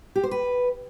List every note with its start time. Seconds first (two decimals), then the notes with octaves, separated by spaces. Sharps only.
0.16 G4
0.23 C5
0.31 B4